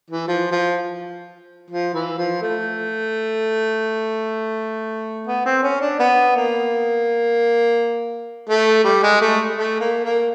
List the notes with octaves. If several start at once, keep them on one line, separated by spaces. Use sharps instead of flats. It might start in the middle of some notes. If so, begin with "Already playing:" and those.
E3
F3
F3
F3
E3
F3
A3
B3
C4
C#4
D4
B3
A#3
A3
G3
G#3
A3
A3
A#3
A#3